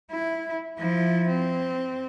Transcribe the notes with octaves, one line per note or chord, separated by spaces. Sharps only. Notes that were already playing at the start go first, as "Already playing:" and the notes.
E4
F3 E4
C4